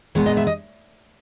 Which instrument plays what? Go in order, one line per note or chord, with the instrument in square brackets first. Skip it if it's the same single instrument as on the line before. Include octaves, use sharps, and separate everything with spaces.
[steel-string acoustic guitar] A#2 G#3 B3 C#5
D#5
E5
D#5